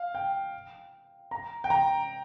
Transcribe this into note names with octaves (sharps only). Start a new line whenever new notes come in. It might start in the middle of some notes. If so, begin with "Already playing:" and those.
Already playing: F5
G5
A#5
G5
A#5